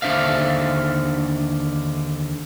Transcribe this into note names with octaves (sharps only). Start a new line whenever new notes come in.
D#2 D3 D4 C5 E5 F5